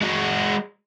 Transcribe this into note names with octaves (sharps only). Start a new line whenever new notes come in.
G#3 F#4